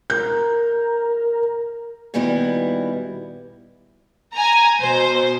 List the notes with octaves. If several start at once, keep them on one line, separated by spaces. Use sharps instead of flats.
A#4 G6
A#2 D#3 G3 B3 E4 F#4
G#5 A#5
B2 C5